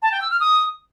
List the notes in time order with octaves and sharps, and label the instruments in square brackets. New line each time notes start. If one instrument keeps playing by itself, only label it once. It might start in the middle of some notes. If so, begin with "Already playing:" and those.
[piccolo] A5
G5
E6
F6
D#6